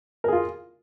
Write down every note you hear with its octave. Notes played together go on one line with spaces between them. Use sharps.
F4 G#4 A#4